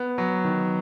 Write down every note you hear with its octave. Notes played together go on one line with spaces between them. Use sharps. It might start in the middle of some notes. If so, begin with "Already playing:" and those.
Already playing: B3
F#3
D#3